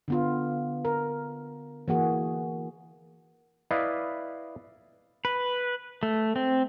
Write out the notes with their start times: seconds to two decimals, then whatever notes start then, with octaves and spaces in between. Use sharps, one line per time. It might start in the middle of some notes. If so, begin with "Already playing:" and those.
0.08 D3 B3 F4
0.85 A#4
1.88 E3 A#3 F#4 G#4
3.71 E4 B4 D5 D#5 F5
5.25 B4
6.03 A3
6.36 C4